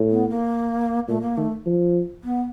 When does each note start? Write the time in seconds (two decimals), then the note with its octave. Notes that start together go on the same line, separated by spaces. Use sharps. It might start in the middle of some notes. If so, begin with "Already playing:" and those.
Already playing: A2
0.10 B3
0.29 A#3
1.08 A#2 A3
1.21 A#3
1.37 D#3 A3
1.66 F3
2.24 B3